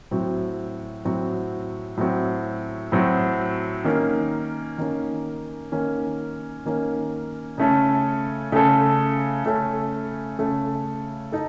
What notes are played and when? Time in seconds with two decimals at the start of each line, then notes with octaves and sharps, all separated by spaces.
0.11 A2 F#3 C4 F#4
1.05 A2 F#3 C4 F#4
1.97 A2 F#3 C4 F#4
2.92 A2 F#3 C4 F#4
3.84 D#3 A#3 C#4
4.78 D#3 A#3 C#4
5.72 D#3 A#3 C#4
6.66 D#3 A#3 C#4
7.58 C#3 A3 C#4 A4
8.52 C#3 A3 C#4 A4
9.44 C#3 A3 C#4 A4
10.38 C#3 A3 C#4 A4
11.32 D#4 A4